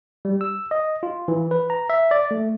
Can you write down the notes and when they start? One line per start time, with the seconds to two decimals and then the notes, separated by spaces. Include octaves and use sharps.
0.25 G3
0.41 E6
0.71 D#5
1.03 F4
1.28 E3
1.51 B4
1.70 A#5
1.90 E5
2.11 D5
2.31 A3